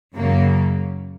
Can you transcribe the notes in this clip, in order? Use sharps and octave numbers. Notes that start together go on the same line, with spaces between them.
F#2 C#3 F#3 A#3